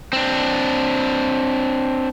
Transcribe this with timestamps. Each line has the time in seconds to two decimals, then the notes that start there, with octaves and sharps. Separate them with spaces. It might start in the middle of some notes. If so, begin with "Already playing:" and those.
0.13 C4 D4